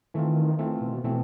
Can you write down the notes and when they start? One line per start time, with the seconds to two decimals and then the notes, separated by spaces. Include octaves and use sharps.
0.14 D#3 E3 A3 C4 F4
0.59 E3 A3 C4 F4
0.81 B2
1.04 B2 E3 A3 C4